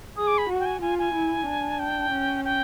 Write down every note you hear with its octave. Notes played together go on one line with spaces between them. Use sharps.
G#4 D#6
D6
B5
F#4
G5
G#5
F4 G#5
G#5
E4
D4
G5
C#4
G5